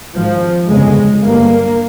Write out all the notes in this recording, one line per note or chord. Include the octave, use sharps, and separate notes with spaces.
G#1 G#2 F3
G1 F2 C#3 G#3
G1 G2 A#3